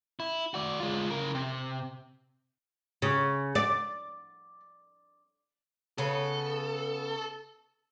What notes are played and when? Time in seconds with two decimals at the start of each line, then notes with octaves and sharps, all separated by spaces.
0.20 E4
0.54 F#4 D5
0.80 G#3 F4
1.10 C#3 A#4
1.35 C3
3.02 C#3
3.55 D5
5.98 C#3 B3 A4